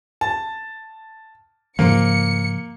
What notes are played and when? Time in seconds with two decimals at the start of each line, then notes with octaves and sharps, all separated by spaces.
0.21 A5
1.79 G#2 C#3 F3 A#3 C#7